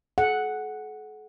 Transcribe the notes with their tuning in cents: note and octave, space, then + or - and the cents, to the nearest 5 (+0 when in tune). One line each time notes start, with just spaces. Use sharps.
A4 -45 F#5 +0